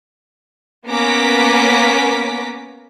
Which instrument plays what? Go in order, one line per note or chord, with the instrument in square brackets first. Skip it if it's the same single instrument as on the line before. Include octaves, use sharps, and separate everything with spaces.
[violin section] A#3 B3 C#4 A#5 D6 B6